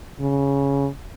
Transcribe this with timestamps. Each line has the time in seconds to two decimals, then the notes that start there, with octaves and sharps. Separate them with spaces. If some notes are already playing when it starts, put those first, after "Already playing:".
0.20 C#3